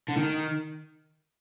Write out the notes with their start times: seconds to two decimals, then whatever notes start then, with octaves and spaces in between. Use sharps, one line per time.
0.08 D3
0.17 D#3